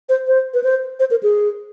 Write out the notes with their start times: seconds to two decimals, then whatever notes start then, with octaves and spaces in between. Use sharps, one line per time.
0.09 C5
0.27 C5
0.54 B4
0.64 C5
1.00 C5
1.11 A#4
1.23 G#4